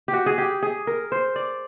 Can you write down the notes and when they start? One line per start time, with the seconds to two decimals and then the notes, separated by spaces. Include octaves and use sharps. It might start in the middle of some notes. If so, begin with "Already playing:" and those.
0.08 G4
0.13 F#4
0.26 G#4
0.38 G4
0.63 G#4
0.87 A#4
1.12 C5
1.36 D5